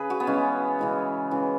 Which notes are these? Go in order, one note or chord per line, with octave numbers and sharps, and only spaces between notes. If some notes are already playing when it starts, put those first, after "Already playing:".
Already playing: C#3 G#4 B4
F#4
B3
C#3 E3 G#3 C#4
C#3 E3 G#3
C#3 E3 G#3